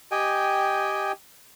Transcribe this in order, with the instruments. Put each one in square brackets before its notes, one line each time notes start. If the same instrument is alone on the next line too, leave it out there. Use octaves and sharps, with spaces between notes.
[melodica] G4 D#5 G5 G#5